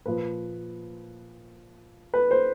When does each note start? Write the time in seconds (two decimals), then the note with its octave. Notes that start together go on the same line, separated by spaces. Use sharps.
0.06 A#2 F3 B4
2.14 B4
2.31 C5